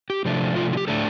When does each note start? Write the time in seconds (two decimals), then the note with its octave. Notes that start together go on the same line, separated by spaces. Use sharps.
0.10 G4
0.25 C3 F3 A3 D4
0.56 F4
0.73 F4
0.77 G4
0.88 A2 A3 D4 A4